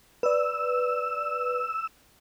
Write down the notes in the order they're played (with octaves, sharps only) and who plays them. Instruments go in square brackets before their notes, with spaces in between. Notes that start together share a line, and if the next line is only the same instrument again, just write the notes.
[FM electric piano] B4 D5 [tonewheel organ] E6